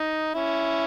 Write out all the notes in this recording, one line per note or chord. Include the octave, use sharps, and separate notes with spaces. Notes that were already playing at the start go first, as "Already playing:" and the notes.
Already playing: D#4
C#4 E4